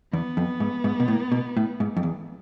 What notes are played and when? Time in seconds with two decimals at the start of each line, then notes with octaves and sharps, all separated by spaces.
0.13 E2 B3
0.37 F2
0.60 G#2
0.84 G#2
1.00 B2
1.08 A2
1.32 B2
1.57 A2
1.80 G#2
1.97 F2
2.03 E2